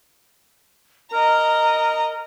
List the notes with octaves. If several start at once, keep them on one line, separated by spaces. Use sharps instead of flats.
A#4 D#5 A#5